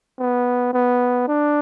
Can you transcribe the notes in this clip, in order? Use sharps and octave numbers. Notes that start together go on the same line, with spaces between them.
B3
B3
D4